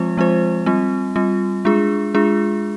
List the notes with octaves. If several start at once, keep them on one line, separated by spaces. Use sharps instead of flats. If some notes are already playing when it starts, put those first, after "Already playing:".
Already playing: F3 G#3 C4 F4 C5
F3 G#3 C4 F4 C5
G3 C4 F4
G3 C4 F4
G#3 D4 F4 G#4
G#3 D4 F4 G#4